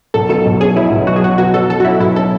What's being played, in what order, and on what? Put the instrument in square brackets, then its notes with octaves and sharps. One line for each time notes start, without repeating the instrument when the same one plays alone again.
[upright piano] B1 [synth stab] A4
[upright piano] B2 [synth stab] A4
[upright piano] B1
[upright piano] C#4 [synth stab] G#4
[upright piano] F#3 [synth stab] E4
[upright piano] B1
[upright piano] B2 [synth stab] F#4
[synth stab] G#4
[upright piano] F#3 [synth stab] F#4
[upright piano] B2 [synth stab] F#4
[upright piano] F#3 [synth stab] A4
[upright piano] F#3 [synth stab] A4
[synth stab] F#4
[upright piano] C#4 [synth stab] E4
[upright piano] B1 [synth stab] E4
[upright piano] C#4 [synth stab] A4